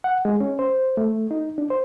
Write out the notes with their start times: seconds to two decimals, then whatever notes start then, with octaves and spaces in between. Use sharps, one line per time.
0.04 F#5
0.25 G#3
0.41 C#4
0.59 C5
0.97 A3
1.31 D#4
1.58 D4
1.70 C5